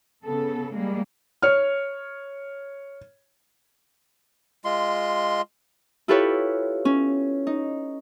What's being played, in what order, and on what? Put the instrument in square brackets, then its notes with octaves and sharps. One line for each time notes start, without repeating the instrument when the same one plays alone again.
[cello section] C#3 B3 A4
G3 G#3 A#3
[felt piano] C#5 F6
[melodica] G#3 F4 C6
[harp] E4 F4 G4 A4 B4 C#5
C#4
D#4